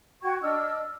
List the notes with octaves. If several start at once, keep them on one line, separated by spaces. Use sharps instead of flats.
F#4 G5 C#6 G#6
D4 D#5 E6 F6